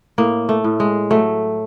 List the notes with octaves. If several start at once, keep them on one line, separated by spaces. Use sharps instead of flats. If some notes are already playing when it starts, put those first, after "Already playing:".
A2 A#3
A3
A2
G#3
F#3 A3